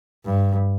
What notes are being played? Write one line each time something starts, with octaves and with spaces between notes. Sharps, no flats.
G2